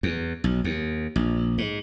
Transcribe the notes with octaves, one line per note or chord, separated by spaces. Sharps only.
E2
B1
D#2
A#1
G#2